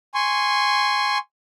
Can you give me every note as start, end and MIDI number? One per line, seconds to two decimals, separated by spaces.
0.14 1.18 80
0.14 1.18 84
0.14 1.18 85